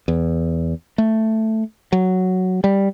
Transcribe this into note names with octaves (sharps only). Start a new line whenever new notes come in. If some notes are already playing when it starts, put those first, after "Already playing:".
E2
A3
F#3
G3